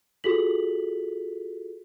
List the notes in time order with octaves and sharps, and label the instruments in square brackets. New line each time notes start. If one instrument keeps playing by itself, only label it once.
[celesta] F4 F#4 G#4 A4 B6 F#7